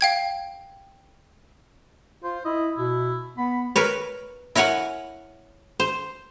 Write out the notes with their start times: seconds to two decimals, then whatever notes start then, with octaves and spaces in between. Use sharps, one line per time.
0.01 F5 G5 G#6
2.24 F4 C5
2.45 E4 D#5
2.77 B2 E4
3.38 B3 B5
3.76 A#4 B4 C#5
4.55 E4 A#4 C#5 F#5 G#5
5.80 C5